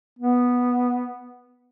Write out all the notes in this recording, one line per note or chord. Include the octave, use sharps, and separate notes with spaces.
B3